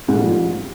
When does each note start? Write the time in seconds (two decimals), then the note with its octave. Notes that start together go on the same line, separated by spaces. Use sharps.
0.08 G#2
0.13 A2
0.19 G3
0.24 F3